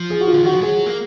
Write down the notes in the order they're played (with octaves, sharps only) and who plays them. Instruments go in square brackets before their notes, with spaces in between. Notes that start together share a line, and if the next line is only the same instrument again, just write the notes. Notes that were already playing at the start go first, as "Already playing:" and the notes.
Already playing: [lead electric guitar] F3
[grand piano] G#4
F#4
F4
[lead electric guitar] D3
[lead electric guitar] D#3 [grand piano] F#4
[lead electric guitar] F3
[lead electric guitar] F#3 [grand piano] G#4
[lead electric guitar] A#3